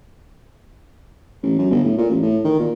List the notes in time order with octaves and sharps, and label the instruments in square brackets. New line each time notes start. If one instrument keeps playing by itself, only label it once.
[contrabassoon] A1
F#2
G1
A2
A#2
A1
A2
D#3
A#2